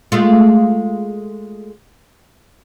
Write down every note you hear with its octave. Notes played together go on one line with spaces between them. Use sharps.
G#3 A3 F4